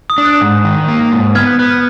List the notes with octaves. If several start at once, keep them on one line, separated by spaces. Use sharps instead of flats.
D#6
D4
F#6
G#2
D#3
A#3
G#2
B3 F6 G#6
F#6
B3 F#6
F6